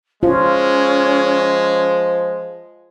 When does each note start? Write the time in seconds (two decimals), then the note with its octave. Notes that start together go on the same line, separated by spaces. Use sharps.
0.23 F3 G#3 C#4 F4